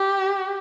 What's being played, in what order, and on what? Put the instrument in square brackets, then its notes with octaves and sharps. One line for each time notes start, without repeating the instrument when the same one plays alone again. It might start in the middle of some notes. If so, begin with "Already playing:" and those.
Already playing: [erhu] G4